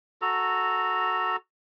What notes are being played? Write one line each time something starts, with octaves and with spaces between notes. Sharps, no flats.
F#4 A4 A#5